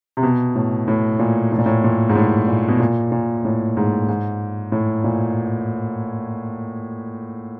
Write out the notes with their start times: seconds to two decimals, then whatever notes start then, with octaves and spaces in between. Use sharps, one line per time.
0.17 C3
0.23 B2
0.55 A2
0.88 A2
1.19 A#2
1.52 A2
1.59 A#2
1.66 A2
1.84 A#2
2.09 G#2
2.16 A2
2.48 A#2
2.68 B2
2.80 A#2
3.12 A#2
3.45 A2
3.77 G#2
4.08 G#2
4.72 A2
5.04 A#2